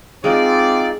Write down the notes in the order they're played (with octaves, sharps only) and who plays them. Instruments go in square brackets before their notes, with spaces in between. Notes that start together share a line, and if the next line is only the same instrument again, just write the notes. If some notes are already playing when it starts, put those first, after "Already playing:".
[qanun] G#3 [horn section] C4 D5 [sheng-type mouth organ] D#4 F4 D6